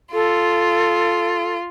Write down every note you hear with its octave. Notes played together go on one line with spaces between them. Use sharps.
F4 A4